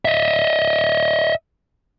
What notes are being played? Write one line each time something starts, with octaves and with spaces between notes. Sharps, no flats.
D#5 E5